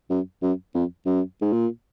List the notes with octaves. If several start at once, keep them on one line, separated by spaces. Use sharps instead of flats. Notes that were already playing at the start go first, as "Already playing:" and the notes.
F#2
F#2
F2
F#2
G#2
A#2